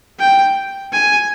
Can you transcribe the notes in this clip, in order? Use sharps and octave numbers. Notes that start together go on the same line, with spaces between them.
G5
G#5